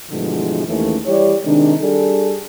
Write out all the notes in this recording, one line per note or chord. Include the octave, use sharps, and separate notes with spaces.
G2 B2 D3 E3 F3 G#3
D#2 E3 G#3 A3 C#4
E3 G3 E4 G4 C#5 D5
C3 D#3 G#3 D4
G3 D4 G#4 A4